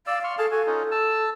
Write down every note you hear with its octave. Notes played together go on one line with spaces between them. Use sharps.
D5 F5 E6
C6 C#6 F6
G#4 A4 F5 A5
F#4 A4 G#5
C#4 D#4 F4
A5 E6